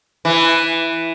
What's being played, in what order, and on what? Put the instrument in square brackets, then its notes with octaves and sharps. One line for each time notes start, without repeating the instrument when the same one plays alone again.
[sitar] E3